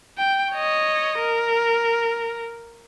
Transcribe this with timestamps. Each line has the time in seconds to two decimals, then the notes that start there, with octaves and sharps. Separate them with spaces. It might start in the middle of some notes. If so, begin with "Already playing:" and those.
0.18 G5
0.53 C#5 D#5
1.19 A#4